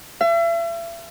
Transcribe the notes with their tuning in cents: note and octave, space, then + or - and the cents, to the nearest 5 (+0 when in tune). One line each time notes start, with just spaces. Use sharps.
E5 +40